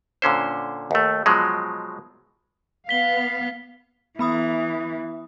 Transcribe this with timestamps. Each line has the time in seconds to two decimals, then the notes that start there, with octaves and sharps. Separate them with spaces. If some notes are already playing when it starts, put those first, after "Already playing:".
0.22 A#2 D3 C#4 C5
0.91 D#2 A3
1.26 B2 F3 F#3 G#3
2.89 B3 F5 B6 G7
4.19 E3 B3 B5 D#6